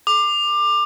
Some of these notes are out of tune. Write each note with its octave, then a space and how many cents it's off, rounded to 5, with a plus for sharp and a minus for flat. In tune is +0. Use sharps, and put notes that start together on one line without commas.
D6 +20